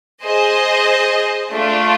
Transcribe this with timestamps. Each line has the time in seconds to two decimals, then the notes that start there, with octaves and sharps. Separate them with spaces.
0.24 G#4 C5 D#5
1.51 A3 D4 F4